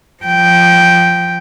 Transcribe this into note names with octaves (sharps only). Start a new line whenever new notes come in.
F3 G5